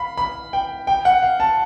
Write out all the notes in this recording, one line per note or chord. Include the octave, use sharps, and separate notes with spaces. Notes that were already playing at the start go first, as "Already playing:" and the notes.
Already playing: F5 B5
B5
G5
G5
F#5
F5
A5